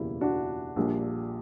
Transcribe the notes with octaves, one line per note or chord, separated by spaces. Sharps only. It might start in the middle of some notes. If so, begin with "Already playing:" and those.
Already playing: F#1 E2 B2 G3 A#3 E4
D4 F#4
A#1 A#2 G3 A#3